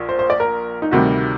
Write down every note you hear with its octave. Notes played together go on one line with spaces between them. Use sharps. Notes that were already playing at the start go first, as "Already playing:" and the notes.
Already playing: A#1 A#2
C5
C5
D5
A#4
D#4
D2 C3 D#3 G3 F#4